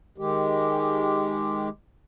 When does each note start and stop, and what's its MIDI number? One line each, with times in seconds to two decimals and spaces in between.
0.18 1.69 51
0.18 1.69 56
0.18 1.69 67